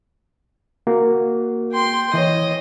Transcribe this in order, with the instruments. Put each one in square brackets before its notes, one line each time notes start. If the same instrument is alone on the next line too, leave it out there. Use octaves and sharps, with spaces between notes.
[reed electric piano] A#3 F#4
[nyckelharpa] G5 C6
[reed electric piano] E3 C#5 [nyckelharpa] D#5